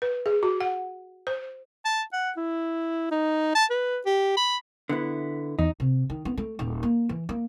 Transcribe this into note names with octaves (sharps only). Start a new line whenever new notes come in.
B4
G#4
F#4
F#5
C5
A5
F#5
E4
D#4
A5
B4
G4
B5
D3 B3 E4
E2 D#4
C3
D#3
B3
A3
D#1
A#3
E3
A#3